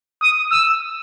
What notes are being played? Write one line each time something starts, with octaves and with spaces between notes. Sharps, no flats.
D#6
E6